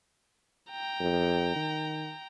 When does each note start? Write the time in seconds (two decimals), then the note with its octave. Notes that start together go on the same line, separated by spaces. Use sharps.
0.71 G5 A#5
1.00 F2
1.56 D#3